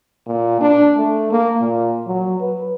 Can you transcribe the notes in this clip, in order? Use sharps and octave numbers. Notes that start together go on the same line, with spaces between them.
A#2
D4
A3
A#3
A#2
F#3
B4